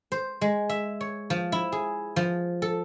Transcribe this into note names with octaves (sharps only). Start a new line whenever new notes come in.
C5
G#3
E5
C#5
F3
E4
G#4
F3
A4